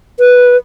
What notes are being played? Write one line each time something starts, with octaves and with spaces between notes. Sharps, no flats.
B4